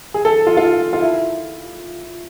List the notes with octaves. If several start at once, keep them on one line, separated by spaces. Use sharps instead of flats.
G#4
A4
F4
F4
F4
E4